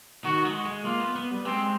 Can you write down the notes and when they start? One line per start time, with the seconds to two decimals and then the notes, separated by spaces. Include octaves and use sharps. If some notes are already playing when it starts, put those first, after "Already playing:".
0.24 D#3 F#4
0.45 G#3
0.65 G#3
0.84 A#3 F4
1.00 B3
1.16 B3
1.31 G3
1.45 G#3 C4